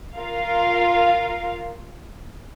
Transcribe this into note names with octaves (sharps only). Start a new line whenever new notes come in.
F4 A#4 F5